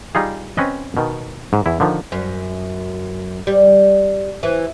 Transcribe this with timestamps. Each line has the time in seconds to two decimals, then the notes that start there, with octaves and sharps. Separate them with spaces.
0.15 G3 D#4 F4 G#4
0.57 C4 C#4 B4 D#5
0.97 B2 D#3
1.53 G#2
1.66 E2 E4
1.80 D3 D#3 F3
2.12 F#2
3.47 G3
4.43 E3